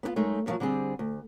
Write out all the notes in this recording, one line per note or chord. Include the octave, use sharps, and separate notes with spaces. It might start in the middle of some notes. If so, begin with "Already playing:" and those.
B3 D4 F4
F#2 G#3 A3 D#4
D#2 C3 D#3 F3 F#3
D3 G3 C4 G#4
D2